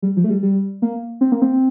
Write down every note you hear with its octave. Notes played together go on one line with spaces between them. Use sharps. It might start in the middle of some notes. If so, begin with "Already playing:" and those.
G3
F3
A3
G3
G3
A#3
C4
A#3
C4